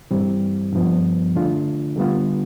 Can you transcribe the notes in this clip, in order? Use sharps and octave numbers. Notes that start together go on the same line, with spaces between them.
G2 E3 G3 C4
G2 F3 B3
D3 A3 D4 F4
D3 G3 B3 F4